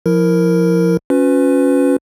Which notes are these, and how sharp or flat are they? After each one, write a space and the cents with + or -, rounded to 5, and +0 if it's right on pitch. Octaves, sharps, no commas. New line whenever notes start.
F3 +0 E4 +0 A#4 +0
C#4 +0 F4 +45 B4 +20